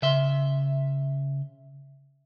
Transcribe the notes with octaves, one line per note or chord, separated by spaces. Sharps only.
C#3 E5 C6